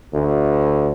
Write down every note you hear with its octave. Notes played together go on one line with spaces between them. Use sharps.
D2